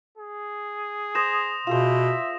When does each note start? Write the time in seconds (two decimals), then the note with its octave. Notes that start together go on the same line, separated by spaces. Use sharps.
0.18 G#4
1.15 C5 D#6 A#6 E7
1.67 B2 F4 G#4 C5 E5 E7